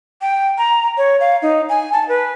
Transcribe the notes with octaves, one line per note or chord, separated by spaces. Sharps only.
G5
A#5
C#5
F5
D#4
G#5
A5
B4